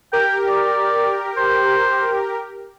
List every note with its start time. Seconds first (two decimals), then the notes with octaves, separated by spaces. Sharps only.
0.13 G4 A#4 G5
0.48 D5
1.37 C5